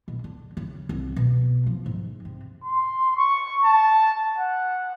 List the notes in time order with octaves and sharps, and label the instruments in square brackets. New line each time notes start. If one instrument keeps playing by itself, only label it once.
[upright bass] B2
D3
C#3
C2
B2
F3
G#2
C3
[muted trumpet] C6
C#6
A5
F#5